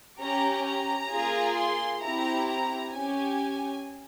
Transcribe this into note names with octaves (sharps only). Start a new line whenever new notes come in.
C#4 G4 A#5
A#5
A#3 F4 G#4
C6
C4 E4 G4 A#5
A#5
C#4 G4 G#5